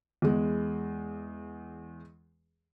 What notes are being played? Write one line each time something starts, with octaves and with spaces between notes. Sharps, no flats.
E2 G#3